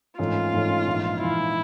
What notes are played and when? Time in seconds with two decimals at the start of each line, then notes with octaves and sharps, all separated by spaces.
0.19 G#1 G#2 E3 A3 C#4 F4
0.53 G#1 G#2 E3 A3 C#4
0.87 A#1 G#2 E3
1.20 A#1 G#2 E3 E4